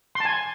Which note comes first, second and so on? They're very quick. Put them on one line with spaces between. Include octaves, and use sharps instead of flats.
C6 A5 G#5